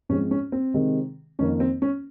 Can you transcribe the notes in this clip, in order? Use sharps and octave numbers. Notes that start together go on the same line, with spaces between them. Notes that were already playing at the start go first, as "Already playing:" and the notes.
G#2 F3 G#3 C4 C#4
C#4
C4
C3 D#3 G#3 C4
F2 D#3 A#3 C#4
C4
C#4